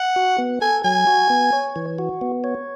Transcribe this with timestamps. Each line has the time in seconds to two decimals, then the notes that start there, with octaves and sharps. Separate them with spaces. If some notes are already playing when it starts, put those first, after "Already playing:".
Already playing: F#5
0.16 F#4
0.38 B3
0.61 A4 G#5
0.84 F#3 G#5
1.07 F#4
1.30 B3
1.53 C#5
1.76 E3
1.99 F#4
2.21 B3
2.44 C#5